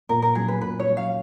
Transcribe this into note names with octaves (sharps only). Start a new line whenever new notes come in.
A#2 A#4
A#4
F#3 C#4 G#4
B4
A#2 B4
C#5
F#3 C#4
F5